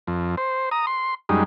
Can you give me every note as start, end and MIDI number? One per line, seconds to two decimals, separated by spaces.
0.07 0.36 41
0.37 0.69 72
0.71 0.86 82
0.71 0.86 87
0.87 1.14 84
1.29 1.43 42
1.29 1.43 55
1.29 1.43 56
1.29 1.43 63